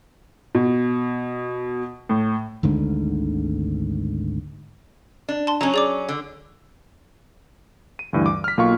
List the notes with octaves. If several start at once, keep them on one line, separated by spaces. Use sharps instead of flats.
B2
A2
G#1 D2 G#2 D3
D4
A5 C6
F#3 C#4 A#5
G#4 D5 D6
D3
D#7
D2 G2 E3
D6
F6 B6
B1 A#3 F4 F5 C#6